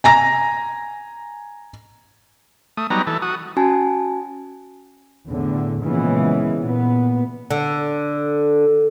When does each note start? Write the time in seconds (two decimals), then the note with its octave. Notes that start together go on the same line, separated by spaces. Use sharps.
0.04 G#5 A#5 A#6
2.77 A3 D#6
2.90 F#3 G3 B3 D#4 A#5
3.07 E3 A4
3.22 F#4 D#6
3.57 C#4 F#4 G#5 A5
5.27 E2 A2 D3
5.82 A#2 C#3 E3 F3 G#3 B3
6.61 A#2 B3
7.51 D3